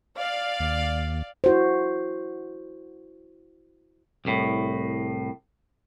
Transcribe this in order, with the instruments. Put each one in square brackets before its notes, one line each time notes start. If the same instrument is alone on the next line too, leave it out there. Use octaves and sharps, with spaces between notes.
[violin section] D5 F5
[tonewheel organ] D#2
[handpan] E4 F#4 C5
[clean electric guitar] C2 A2